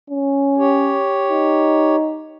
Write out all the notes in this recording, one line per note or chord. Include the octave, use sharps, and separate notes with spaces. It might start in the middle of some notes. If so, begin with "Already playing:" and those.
C#4
G4 C#5
D#4